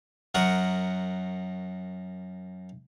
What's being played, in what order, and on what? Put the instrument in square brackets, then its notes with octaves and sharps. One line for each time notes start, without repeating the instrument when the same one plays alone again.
[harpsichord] F#2 A#4 F#5 C#6 D#6